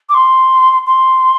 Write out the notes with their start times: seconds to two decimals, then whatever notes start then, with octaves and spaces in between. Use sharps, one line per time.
0.09 D6
0.14 C6
0.86 C6